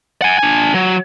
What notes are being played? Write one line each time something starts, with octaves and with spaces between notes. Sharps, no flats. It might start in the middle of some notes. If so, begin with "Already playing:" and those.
F#5 G#5
D4 G#5
F#3